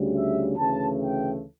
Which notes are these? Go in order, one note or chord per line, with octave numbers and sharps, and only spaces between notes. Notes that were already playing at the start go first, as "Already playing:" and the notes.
Already playing: D2 C#3 G3
E5
D2 C#3 E3 A3 A5
G5